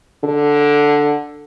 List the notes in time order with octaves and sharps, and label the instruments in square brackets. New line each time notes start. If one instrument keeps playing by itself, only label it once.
[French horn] D3